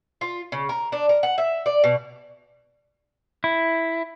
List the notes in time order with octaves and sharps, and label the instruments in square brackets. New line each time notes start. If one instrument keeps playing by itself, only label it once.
[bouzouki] F4
C#3
A#4
D4
A#4
F#5
E5
D5
B2
[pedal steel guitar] E4